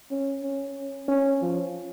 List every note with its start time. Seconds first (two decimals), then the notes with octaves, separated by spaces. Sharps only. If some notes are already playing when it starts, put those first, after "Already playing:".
0.11 C#4
0.43 C#4
1.08 C#4
1.42 F3